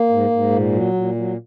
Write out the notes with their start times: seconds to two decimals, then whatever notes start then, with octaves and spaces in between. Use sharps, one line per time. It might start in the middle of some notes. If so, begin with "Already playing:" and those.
Already playing: A#3
0.09 G#2
0.30 G#2
0.50 A#2
0.72 F#3
0.94 A#2
1.15 F#3